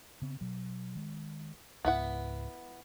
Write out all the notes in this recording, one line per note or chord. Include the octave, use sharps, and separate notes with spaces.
C#3 B3 C4
B2 F#3
D#3 G#3
C#2 G#2 B3 E4 F#5